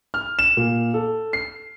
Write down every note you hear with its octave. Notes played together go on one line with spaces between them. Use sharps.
F6
E7
A#2
A4
C7